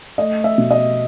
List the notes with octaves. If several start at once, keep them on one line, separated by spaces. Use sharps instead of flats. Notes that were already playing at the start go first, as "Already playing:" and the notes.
A3 D#5
E5
B2
D#5